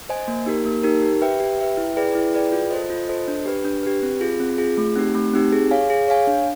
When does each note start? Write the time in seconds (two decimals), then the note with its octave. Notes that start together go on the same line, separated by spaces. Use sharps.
0.09 C5 D#5 G#5
0.28 A#3
0.46 D#4 G4 A#4
0.65 A#3
0.83 D#4 G4 A#4
1.02 G4
1.22 B4 E5 G5
1.40 G4
1.58 B4 E5 G5
1.77 E4
1.96 G#4 B4 D5 G5
2.15 E4
2.34 G#4 B4 D5 G5
2.52 F4
2.71 A4 C5 D#5
2.90 F4
3.08 A4 C5 D#5
3.28 D4
3.46 G4 B4
3.65 D4
3.83 G4 B4
4.03 C4
4.21 F4 G#4
4.40 C4
4.58 F4 G#4
4.78 A3
4.95 C4 D#4 G4
5.15 A3
5.34 C4 D#4 G4
5.52 G#4
5.71 C#5 F5 G#5
5.90 G#4
6.08 C#5 F5 G#5
6.27 D4